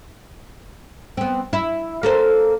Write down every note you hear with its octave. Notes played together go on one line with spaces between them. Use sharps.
B3 C4
E4
A#3 A4 C5